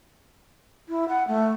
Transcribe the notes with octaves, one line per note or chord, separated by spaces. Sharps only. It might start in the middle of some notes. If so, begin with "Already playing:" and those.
E4
F#5
A3